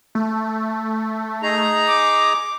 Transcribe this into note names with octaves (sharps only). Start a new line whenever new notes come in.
A3
D#4 G#4 A#5
D6